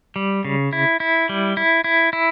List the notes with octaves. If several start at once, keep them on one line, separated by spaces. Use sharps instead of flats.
G3
C#3
E4
E4
G3
E4
E4
E4